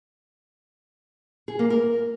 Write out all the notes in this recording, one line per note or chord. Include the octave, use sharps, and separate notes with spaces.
G#4
A#3
A#4